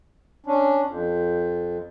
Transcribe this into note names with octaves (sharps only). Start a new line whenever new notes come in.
C#4 D4
F2